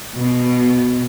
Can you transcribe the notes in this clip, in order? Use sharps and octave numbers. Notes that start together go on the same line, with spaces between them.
B2